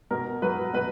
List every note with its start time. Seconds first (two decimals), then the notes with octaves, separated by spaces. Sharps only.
0.11 B2 A#4
0.42 F#3 B4
0.74 B2 B4